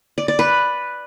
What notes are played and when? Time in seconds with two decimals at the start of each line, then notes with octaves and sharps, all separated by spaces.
0.18 D5
0.28 D5
0.39 B4